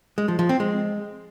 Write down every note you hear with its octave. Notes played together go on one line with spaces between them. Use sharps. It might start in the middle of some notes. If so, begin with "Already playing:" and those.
G#3
F3
F3
C4
G#3